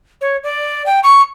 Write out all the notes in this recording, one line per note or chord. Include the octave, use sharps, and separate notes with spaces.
C#5
D5
G5
C#6